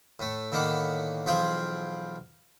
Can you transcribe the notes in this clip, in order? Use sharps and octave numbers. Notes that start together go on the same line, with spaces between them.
A2 A3
A2 D3 D#3 A#3 B3
B1 E3 F3 F4 G#4 G5